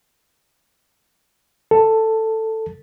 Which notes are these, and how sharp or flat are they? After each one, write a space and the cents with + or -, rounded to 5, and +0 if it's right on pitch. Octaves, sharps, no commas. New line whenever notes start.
A4 +10